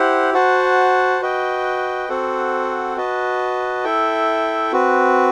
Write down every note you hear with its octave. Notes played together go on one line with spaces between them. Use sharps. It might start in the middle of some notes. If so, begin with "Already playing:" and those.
Already playing: E4 G4 C5 F#5
F#4 C5 F#5 A5
F#4 B4 D#5 G5
C4 F#4 A4 C5 F#5
F#4 B4 D#5 A5
E4 A4 E5 G5
C4 F#4 B4